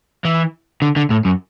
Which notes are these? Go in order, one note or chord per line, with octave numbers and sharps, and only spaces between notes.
E3
D3
D3
A2
F#2